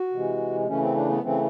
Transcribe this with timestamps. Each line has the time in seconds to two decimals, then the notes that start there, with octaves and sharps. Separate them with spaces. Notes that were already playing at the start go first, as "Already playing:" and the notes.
Already playing: F#4
0.12 C3 E3 G#3
0.67 C#3 E3 A3 C#4
0.82 C4
0.95 D4
1.10 B3
1.23 C#3 E3 A3 C4